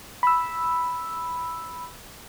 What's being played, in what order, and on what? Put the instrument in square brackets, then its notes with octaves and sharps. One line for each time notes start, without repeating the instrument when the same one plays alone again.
[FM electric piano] B5 E6